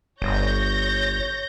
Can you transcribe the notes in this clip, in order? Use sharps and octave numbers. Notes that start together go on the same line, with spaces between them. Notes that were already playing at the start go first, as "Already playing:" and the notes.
G1 C#5 G6 A#6